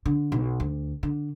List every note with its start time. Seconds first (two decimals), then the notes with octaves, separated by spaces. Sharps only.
0.06 D3
0.32 B1
0.60 D2
1.03 D3